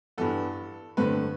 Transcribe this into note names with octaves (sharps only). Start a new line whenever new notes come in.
G2 E3 B3 A4
G2 D3 A3 C4 B4